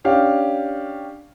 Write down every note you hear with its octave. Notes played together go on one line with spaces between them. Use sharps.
C#4 D4 G4 F5